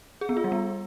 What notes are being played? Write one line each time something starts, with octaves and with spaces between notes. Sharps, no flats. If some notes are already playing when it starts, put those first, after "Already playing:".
G#4
B3
F4
G3
B3